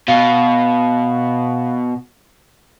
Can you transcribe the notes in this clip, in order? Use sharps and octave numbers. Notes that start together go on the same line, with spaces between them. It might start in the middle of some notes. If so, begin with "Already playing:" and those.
B2 F5